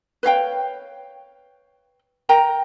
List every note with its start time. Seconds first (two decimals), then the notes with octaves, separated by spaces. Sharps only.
0.23 B4 C#5 F5 G5
2.29 A#4 G5 A#5